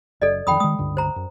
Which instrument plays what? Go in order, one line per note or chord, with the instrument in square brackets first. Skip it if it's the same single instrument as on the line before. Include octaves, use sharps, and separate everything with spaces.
[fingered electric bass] F#1 [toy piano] A4 D5 D#5
[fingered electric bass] F2 D#3 [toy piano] G5 B5 D#6
[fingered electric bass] D#3 G#3 [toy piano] D#6
[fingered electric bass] C#2 G2 D3
[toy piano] C5 A#5
[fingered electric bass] F#2